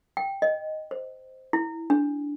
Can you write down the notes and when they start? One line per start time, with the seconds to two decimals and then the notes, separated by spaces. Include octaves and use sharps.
0.17 G5
0.42 D#5
0.91 C5
1.53 E4
1.90 D4